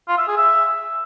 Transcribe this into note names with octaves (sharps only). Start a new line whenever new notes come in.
F4
E5
G#4
E5